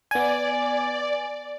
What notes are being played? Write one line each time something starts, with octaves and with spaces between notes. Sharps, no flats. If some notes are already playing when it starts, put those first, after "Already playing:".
B3 D5 G#5